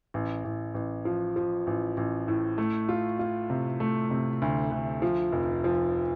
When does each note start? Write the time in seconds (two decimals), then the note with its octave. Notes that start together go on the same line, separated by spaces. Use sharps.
0.14 A1
0.44 A1
0.74 A1
1.05 F3
1.36 F3
1.67 A1
1.97 A1
2.28 A2
2.58 A3
2.89 F4
3.19 F4
3.50 C3
3.80 A3
4.11 C3
4.42 D2
4.72 D2
5.02 F3
5.32 F1
5.64 F3